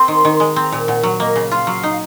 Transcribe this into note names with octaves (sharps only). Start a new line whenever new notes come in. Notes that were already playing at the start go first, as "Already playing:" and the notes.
Already playing: C4 C6
D#3
D#3
G#3
C4 A#5
A#2
A#2 F#5
F#3
A#3 D#5
C#3
F4 F5
F#3
D#4